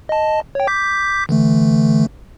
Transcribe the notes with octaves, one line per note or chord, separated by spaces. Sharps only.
D#5 A5
C#5 G5
D6 G6 B6
D3 E3 A3